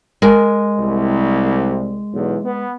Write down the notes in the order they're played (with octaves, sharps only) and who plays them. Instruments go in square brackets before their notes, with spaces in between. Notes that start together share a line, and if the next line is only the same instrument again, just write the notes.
[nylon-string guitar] G#3 A#4 G#5
[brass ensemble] C2
B1 E2
B3